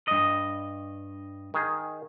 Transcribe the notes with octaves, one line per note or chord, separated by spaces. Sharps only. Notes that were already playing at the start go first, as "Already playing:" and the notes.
G2 D#5
D#3 G#4